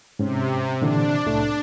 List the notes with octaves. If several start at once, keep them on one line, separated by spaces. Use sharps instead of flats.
G#2 C3 C#4
A#2 D3 E3 D4
C2 A2 A3